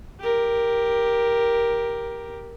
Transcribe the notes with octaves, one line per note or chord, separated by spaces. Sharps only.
G4 A#4